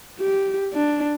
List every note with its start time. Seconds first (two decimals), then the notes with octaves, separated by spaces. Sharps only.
0.19 G4
0.74 D4